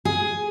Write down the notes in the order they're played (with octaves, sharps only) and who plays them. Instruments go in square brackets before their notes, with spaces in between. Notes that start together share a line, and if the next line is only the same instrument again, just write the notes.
[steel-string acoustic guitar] G#4